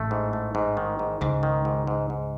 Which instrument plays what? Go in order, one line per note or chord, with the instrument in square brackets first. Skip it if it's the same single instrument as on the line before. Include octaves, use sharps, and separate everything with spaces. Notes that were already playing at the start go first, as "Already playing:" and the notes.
Already playing: [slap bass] A1 A2 [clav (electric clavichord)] A3
[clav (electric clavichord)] G#2
A3
G#2
D#3
G#2
[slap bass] C#2 C#3 [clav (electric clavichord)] G#2
[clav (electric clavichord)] D#3
G#2
G#2
G#2